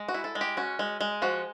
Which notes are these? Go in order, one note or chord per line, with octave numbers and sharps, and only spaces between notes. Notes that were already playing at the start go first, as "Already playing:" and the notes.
Already playing: G#3
F#4
E4
A4
G#3
G4
C#4 F#4
G#3
G#3
F3 F#4